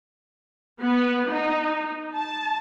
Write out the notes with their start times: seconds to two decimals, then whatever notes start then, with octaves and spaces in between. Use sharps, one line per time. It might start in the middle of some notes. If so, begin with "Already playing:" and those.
0.81 B3
1.30 D#4
2.15 A5